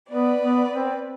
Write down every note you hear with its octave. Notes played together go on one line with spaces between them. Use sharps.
B3 B4 D5
B3
C4